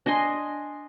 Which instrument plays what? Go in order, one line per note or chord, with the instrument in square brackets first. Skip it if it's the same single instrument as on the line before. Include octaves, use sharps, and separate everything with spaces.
[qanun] D4 D#5 G#5 C6